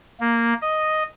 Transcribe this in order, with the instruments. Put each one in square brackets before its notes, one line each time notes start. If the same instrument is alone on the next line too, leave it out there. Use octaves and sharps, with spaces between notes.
[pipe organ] A#3
D#5